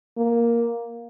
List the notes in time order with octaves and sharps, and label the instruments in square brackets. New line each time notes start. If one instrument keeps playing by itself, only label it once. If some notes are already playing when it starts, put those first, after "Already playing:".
[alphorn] A#3